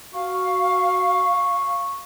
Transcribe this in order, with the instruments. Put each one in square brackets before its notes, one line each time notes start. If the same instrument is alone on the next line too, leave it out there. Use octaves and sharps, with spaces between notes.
[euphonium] F#4 [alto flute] F5 [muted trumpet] C#6